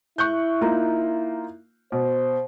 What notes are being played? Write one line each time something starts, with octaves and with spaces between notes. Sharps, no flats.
E4 C#6 F#6 G6
A#3 D#4 F4
B2 C5